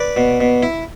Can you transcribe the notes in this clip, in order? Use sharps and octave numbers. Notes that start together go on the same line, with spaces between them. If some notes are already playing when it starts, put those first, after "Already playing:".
Already playing: B4 D5
B2
B2
E4